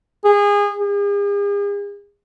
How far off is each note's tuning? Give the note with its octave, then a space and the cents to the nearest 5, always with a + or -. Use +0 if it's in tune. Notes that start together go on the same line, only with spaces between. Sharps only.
G#4 -25
G#4 -45